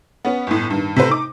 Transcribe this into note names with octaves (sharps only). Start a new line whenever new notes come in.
B3 C#4
G1 A2
G2 D#3
C3 A3 B4 C5
D#4 D6